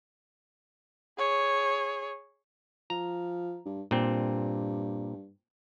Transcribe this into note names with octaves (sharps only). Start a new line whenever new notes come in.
G#4 C#5
F3 A#5
G2
G2 A#2 C4